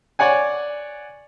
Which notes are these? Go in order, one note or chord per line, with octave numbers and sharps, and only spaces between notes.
C#5 D5 F#5 G#5